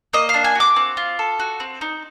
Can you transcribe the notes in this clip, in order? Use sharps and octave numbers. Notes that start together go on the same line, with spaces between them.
A#3 D#5
D4 F5
G#5
F#4 D6
C4
F4
A4
F#4
C4
D#4